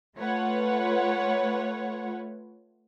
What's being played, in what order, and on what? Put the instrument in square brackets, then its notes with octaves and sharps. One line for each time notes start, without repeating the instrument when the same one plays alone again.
[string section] A3 F4 B4 C#5 F#5